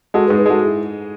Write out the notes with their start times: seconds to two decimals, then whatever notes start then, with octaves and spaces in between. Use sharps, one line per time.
0.14 G#3 F#4 A4
0.26 G#4 B4
0.30 G#2
0.37 G#4 B4
0.46 G#3 F#4 A4
0.62 E4 G#4